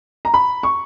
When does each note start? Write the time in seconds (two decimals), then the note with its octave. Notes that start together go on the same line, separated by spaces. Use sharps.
0.25 A#5
0.34 B5
0.63 C#6